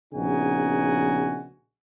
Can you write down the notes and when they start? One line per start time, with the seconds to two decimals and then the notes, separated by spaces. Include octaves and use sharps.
0.14 A#1 C#3 B3 D#4 F#4 G#5